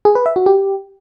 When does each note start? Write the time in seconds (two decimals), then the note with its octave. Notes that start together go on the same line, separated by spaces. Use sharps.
0.05 G#4
0.15 B4
0.26 E5
0.36 F#4
0.46 G4